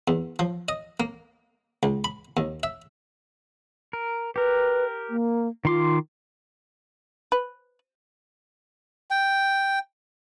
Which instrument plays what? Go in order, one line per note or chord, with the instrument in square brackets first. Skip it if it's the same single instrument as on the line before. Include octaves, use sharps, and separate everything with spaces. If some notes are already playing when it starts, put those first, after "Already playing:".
[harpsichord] E2
F3
D#5
A#3
C#2
B5
D#2
E5
[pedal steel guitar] A#4
[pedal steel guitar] G4 A#4 [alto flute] B4
[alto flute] A#3
[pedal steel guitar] D#3 C6 D6 [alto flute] F4
[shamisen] B4
[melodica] G5